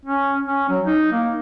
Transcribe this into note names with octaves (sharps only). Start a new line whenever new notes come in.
C#4
C#4
F#3
D#4
A#3